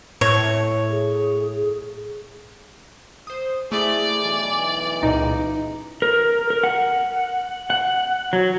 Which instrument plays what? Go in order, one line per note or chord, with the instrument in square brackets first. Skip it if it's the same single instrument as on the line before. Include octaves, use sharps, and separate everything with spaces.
[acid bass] A2 [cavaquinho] C#5
[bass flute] G#4
[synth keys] C5 D#6
[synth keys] A3 [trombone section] E4 G#4 [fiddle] D5
[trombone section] B1 E3 [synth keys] G#5
[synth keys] C#2 A#2 [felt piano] D#4
[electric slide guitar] A#4
A#4
F#5
F#5
F#3